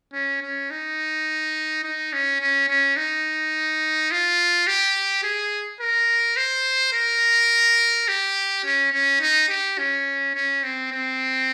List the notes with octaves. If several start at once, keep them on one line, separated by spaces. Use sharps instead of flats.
C#4
C#4
D#4
D#4
C#4
C#4
C#4
D#4
F4
G4
G#4
A#4
C5
A#4
G4
C#4
C#4
D#4
G4
C#4
C#4
C4
C4